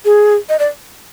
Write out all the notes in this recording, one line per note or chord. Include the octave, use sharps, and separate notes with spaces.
G#4
D#5
D5